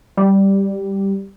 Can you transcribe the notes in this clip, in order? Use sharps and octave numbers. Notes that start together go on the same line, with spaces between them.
G3